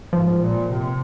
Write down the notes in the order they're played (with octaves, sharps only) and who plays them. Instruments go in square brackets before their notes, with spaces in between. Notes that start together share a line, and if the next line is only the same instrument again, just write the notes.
[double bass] G#2 [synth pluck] F3
[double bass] A#2
C3